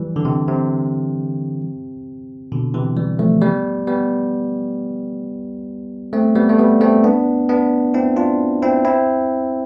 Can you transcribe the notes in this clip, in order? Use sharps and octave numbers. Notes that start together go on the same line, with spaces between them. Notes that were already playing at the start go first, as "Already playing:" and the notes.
Already playing: E3 G3
D3
C3
C3
B2 D3
C3 E3
E3 G3
F3 A3
G3 B3
G3 B3
A3 C4
G3 B3
A3
G3 B3
A3 C4
B3 D4
B3 D4
C4 E4
D4 F4
C4 E4
C4 E4